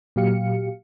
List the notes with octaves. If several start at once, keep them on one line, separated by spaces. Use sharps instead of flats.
A#2 F#3 G4 F5 C#7